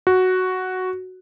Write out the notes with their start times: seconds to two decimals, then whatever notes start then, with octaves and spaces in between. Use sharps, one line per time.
0.07 F#4